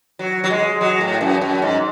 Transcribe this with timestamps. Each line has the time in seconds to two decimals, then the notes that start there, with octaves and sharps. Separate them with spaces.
0.19 F#3
0.44 F#3
0.50 G#3
0.81 F#3
1.01 A2
1.21 F#2
1.41 F#2
1.62 G#2